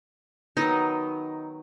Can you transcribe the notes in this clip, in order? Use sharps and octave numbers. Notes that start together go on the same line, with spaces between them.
D#3 F#3 B3 D#4 D#5